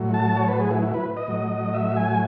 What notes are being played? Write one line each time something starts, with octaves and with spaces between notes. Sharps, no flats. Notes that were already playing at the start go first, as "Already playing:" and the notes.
Already playing: A2 F#3
A5
C#5
B4
G#4
E4
E4
B4
D#5
A2 F#3
E5
G#5